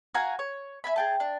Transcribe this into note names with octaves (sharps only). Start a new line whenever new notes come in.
F#4 F5 G#5 A#5
C#5
E5 G#5 B5
G#4 G5 A5
D4